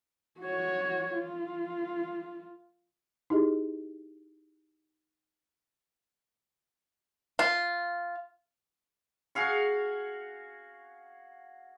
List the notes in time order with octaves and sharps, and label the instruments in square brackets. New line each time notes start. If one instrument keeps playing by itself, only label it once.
[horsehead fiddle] F#4 C#5
F4
[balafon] D#4 E4 G4 G#4 D#5
[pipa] F4
[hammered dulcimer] F#4 G#4 F5 C#6